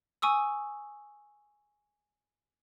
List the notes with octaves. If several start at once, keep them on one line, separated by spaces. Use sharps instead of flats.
G#5 C#6 D#6 E6